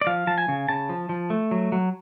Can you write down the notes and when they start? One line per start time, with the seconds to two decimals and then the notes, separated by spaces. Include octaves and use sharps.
0.01 D5
0.07 F3 F5
0.27 F3 A5
0.38 G#5
0.48 C#3
0.69 C#3 A5
0.89 F3
1.09 F3
1.30 A3
1.51 F#3
1.72 F#3